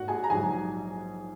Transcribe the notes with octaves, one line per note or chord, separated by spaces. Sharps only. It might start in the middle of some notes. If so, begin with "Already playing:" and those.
Already playing: G#2 A#3 F#4 F#5
G#4 G#5
A#5
A#1 G#2 F#3 G#4 G#5